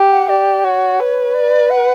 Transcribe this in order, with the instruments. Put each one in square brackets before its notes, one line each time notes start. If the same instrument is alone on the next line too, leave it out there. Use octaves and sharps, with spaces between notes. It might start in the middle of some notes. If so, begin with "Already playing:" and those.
Already playing: [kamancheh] G4
[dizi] F#5
[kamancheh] G4 [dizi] D5
[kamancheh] F#4 [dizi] C#5
[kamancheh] B4
[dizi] D5
F#5